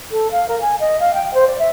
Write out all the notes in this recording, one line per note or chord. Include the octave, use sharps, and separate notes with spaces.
A4
F5
A#4
G#5
D#5
F5
G5
C5
D5
E5